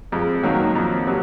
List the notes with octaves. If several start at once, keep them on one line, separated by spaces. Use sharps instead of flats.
F2 G#3
D#3 F#3 A#3
F2
C3 F#3